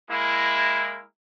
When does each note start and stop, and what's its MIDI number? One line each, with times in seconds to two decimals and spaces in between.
0.11 1.03 56
0.11 1.03 58
0.11 1.03 64